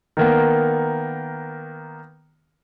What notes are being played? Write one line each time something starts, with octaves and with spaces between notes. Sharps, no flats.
D#3 A#3 B3